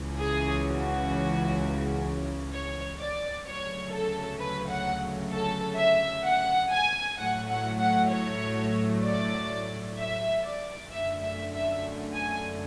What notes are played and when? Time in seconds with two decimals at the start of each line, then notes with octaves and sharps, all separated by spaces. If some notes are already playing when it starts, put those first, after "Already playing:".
Already playing: C#2 C#3 E3
0.20 G#4
0.66 F#4
2.53 C#5
2.98 D5
3.45 D2 C#3 F#3 A3 C#5
3.91 A4
4.39 B4
4.69 F#5
5.31 A4
5.78 E5
6.25 F#5
6.71 G#5
7.18 A2 F#3 A3 F#5
7.49 F#5
7.80 F#5
8.11 C#5
9.05 D5
9.97 E5
10.44 D5
10.90 F#2 D3 A3 E5
11.21 E5
11.53 E5
12.15 G#5